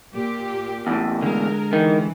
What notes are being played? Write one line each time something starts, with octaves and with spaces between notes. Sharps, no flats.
A#2 G4
E2 A2
D3 G#3 A#4
D#3 E3